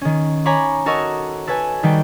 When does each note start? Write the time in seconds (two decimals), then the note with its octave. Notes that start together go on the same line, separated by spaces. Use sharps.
0.01 D#3 C#4
0.45 C#5 G#5 A#5 B5 C#6 D6
0.86 F#4 A4 A#4 C#5 D#5 C#6
1.47 A4 B4 C#5 G#5
1.83 D#3 G3 B4 G5